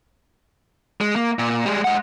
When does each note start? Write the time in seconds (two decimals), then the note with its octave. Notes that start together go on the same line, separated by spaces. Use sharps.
1.01 G#3
1.16 A#3
1.39 A#2
1.66 G3 G#3
1.84 G#3 F#5